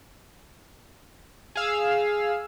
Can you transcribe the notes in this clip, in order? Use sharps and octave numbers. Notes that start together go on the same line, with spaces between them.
G#4 F5 E6